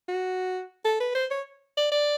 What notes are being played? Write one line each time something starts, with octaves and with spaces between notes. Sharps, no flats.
F#4
A4
B4
C5
C#5
D5
D5